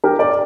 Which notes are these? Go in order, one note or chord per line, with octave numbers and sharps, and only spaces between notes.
G4 A#4
A#4 D5